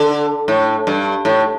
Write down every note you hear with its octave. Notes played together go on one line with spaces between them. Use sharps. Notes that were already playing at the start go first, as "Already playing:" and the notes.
Already playing: D3
A2
G2
A2